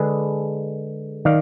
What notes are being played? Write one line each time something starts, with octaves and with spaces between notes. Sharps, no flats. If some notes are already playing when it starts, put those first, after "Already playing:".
Already playing: D3 G#3 D4 G#4 B4
D#3 D5 F5